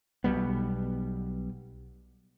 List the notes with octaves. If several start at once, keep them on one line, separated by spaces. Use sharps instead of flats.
B1 B2 G3 B3